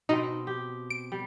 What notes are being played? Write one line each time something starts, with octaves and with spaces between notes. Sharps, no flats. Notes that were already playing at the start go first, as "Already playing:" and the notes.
B2 C4 D#4
G4
D7
G3